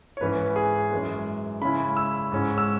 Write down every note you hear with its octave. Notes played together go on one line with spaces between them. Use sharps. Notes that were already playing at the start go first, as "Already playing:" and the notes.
C#5
G#2 E3 C#4 B4
G#4
F#2 E3 G#3
C#3 G#3 C#4 E4 B5
E6
G#2 G#3 C#4 E4
E6